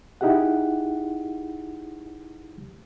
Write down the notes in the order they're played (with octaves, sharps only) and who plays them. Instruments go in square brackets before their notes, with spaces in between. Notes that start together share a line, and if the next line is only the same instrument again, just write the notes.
[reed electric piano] D#4 E4 G4 G#4 F#5